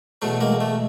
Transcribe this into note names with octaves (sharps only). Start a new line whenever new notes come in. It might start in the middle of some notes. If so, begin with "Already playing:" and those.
E2 B2 F#3 A3
G#3 A#3
A3